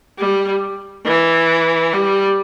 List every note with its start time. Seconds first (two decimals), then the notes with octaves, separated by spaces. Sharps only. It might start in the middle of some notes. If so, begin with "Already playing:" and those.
0.18 G3
1.05 E3
1.93 G3